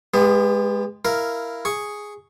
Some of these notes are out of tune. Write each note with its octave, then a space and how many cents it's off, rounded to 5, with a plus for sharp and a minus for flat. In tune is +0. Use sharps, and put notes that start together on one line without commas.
G#3 +0 B3 +0 G4 +40
E4 +0 A#4 +0 F5 -10
G#4 +0 C#6 +0